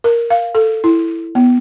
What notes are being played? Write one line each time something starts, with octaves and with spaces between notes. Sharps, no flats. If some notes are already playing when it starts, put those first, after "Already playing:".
A#4
F5
A4
E4
B3